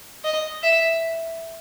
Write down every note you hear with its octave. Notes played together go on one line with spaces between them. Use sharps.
D#5
E5